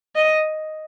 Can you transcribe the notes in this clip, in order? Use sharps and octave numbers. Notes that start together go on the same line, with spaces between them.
D#5